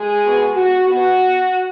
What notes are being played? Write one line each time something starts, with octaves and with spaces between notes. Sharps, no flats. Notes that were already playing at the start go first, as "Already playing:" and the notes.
Already playing: G#3 G#4
B2 B3
F#4
B2 B3 F#4